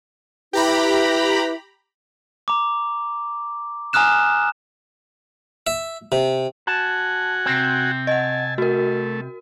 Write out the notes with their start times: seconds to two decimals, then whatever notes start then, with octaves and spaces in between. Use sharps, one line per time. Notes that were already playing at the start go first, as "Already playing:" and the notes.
0.53 E4 G4 B4 E5 A#5 B5
2.48 A#5 D6
3.93 G#5 A#5 D#6 F6 F#6 E7
5.67 E5
6.12 C3
6.67 F#4 F#5 G#5 A5
7.46 C3 C4
8.07 D#5 F#5 G#5 A5
8.58 A3 F#4 A#4